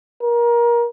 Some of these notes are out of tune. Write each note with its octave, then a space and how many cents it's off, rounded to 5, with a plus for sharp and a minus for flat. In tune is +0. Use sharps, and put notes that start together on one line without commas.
A#4 +25